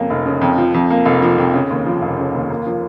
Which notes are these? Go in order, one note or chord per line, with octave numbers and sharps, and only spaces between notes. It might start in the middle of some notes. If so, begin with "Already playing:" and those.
Already playing: F2 C#3 A#3
F1
C#3
F2
F3
F2
A#3
F1
F3
F2
C#3
D#2
F3
F1
C#3
D#2
A#3
F3